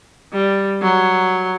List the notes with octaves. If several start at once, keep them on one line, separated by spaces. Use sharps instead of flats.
G3
F#3